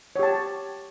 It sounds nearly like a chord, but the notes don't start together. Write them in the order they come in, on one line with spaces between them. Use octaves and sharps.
C#5 G4 A5